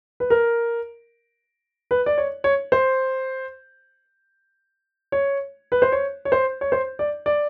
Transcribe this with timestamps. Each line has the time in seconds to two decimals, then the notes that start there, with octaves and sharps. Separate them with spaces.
0.20 B4
0.30 A#4
1.91 B4
2.06 D5
2.18 C#5
2.44 C#5
2.72 C5
5.12 C#5
5.72 B4
5.82 C5
5.92 C#5
6.25 C#5
6.32 C5
6.61 C#5
6.72 C5
6.99 D5
7.26 D5